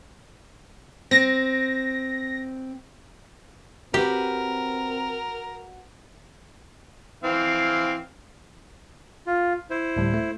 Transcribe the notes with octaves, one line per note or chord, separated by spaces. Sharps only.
C4 A#6
C4 F#4 G4 A#4 B4
E3 C4 F5
F4
E4 C5
D2 A2 G3
A3